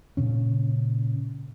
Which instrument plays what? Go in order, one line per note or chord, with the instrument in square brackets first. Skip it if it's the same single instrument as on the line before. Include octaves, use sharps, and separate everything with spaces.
[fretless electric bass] A#2 C#3 C#4